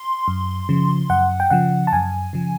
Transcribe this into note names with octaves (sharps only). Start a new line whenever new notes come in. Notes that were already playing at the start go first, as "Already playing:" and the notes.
Already playing: C6
F#2
C#3 F3
F#2 F#5
G5
C#3 F3 F#5
A5
F#2 G#5
C#3 F3